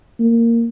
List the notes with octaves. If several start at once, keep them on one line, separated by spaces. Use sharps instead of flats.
A#3